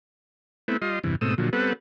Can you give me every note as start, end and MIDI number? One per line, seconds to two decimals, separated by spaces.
0.68 0.77 57
0.68 0.77 59
0.68 0.77 60
0.68 0.77 64
0.82 0.99 55
0.82 0.99 65
0.82 0.99 75
0.82 0.99 84
1.04 1.16 40
1.04 1.16 43
1.04 1.16 48
1.04 1.16 52
1.21 1.34 44
1.21 1.34 47
1.21 1.34 57
1.21 1.34 60
1.21 1.34 87
1.21 1.34 88
1.38 1.50 46
1.38 1.50 50
1.38 1.50 53
1.38 1.50 54
1.53 1.73 55
1.53 1.73 59
1.53 1.73 60
1.53 1.73 69
1.53 1.73 71
1.53 1.73 78